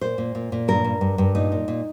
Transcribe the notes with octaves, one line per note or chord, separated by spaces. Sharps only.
A#2 C5
A#2
A#2
A#2
G2 A#4
G2
G2
G2
A#2 D#4
A#2
A#2